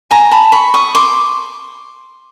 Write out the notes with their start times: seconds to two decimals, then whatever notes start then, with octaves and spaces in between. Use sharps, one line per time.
0.11 G#5 A#5
0.31 A5 B5
0.52 B5 C#6
0.74 C#6 D#6
0.95 C6 D6